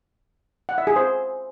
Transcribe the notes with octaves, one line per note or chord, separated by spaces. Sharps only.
F#5
E5
G#4
C5